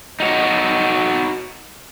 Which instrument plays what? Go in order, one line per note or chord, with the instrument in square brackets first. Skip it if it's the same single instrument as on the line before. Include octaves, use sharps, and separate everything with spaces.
[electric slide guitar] D#4 F#4 C#5